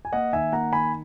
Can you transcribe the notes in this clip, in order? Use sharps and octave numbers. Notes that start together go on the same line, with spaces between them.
G#5
A#3 D#5 F#5
D#3 E5 G#5
A#3 F#5 A#5
D#3 G#5 B5